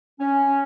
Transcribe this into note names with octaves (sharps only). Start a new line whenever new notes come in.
C#4